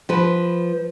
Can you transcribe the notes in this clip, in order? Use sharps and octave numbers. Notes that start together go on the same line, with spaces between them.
F3 B4